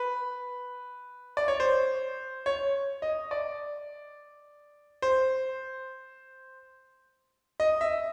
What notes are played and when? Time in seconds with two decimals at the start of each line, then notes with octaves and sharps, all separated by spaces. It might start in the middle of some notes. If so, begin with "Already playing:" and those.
Already playing: B4
1.37 D5
1.48 C#5
1.60 C5
2.46 C#5
3.02 D#5
3.31 D5
5.02 C5
7.60 D#5
7.81 E5